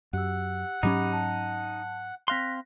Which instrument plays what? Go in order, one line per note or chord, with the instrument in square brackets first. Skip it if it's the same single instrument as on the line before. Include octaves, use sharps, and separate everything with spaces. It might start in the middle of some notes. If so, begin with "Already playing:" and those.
[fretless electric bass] F#2 [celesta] G4 E6 [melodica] F#5
[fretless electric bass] G#2 F#3 C#4 [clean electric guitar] D#4 [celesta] G4 B5 D6
[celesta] A5
[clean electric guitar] C4 F5 C6 [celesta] F#6 A#6 B6